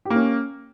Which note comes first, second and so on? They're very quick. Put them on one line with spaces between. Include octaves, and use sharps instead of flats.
G4 A#3 C#4